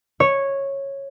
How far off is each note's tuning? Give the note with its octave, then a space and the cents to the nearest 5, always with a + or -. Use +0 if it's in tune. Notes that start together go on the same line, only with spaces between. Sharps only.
C#5 -10